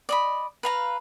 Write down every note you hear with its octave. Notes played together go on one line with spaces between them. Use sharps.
D5 D#5 B5
B4 F5 A#5